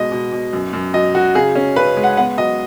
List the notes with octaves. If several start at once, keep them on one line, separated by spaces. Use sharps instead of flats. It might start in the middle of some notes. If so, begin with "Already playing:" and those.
Already playing: B2 G#3 D#5
B2
B2
F#2
F#2
F#3 D#5
F#3 F#4
C#3 G#4
C#4
C#3 B4
G#3
F#5
B3 F#5
F#3 D#5